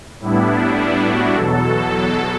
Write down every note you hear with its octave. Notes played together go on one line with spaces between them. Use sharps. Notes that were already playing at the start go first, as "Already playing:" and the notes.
A2 G3 B3 D4 E4
D4
D4
F#4
E2 B2 F#3 A4